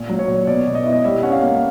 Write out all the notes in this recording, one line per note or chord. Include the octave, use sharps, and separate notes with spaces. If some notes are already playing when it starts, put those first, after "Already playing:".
Already playing: A#2
F#3
C#5
A#2
B2 D5
B2
D#5
E4
D#5
G3 E5
C#4 F#5
F5
A#3